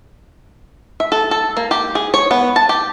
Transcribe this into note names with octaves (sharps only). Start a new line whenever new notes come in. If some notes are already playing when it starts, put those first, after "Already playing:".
E5
A4
A4
A#3
G4
G#4
C#5
B3
A5
G4